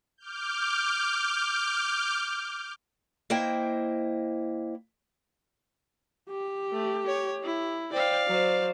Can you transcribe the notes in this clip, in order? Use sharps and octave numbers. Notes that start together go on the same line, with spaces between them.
D6 F6 G6
A#3 E4 C5 D#5 G5
G4
A3
C#5
E4
C5 D5 F5 G5
F#3 C5